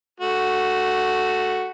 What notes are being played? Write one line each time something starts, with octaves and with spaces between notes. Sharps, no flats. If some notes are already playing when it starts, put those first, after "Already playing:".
A3 F#4